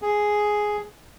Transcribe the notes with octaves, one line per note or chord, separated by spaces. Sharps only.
G#4